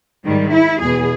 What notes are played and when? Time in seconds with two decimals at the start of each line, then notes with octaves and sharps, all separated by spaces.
0.25 G#2 D#3 G3
0.53 E4
0.81 E2 B2 G#4